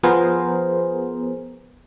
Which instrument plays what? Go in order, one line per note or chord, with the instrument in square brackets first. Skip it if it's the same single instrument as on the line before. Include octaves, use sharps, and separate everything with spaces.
[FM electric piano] F3 B3 G#4 A#4 C5